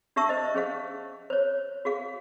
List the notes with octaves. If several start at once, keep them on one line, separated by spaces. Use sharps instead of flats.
D4 G4 E5 A5 C#6 E6
C5 D#5
C#4 G#4 C5 F5
C5 C#5
F#4 G#4 F5